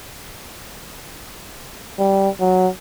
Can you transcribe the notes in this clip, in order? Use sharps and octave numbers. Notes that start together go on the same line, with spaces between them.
G3
F#3